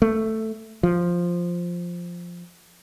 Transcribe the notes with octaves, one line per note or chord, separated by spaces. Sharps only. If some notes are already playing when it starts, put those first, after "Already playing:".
A3
F3